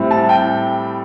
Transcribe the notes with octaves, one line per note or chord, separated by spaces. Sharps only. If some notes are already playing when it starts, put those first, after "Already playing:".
Already playing: A2 G3 C4
A5
G5